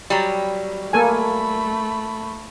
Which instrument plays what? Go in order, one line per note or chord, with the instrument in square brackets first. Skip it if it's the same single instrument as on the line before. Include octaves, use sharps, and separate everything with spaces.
[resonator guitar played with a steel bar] F#3 G3
[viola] A3 B5 [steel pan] A#3 A4 G#5